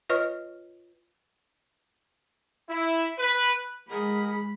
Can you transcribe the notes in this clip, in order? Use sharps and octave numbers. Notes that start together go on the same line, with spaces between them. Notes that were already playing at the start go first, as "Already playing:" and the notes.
F4 B4 C#5 D#5 C#6 F6
E4
B4
G#3 G#4 A#4 D#5 F#5 B5